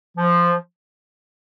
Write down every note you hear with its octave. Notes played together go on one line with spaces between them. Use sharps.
F3